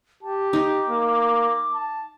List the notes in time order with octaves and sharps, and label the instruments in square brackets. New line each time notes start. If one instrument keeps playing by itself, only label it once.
[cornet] G4 [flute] A5
[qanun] D#4 [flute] D6
[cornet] A#3
A5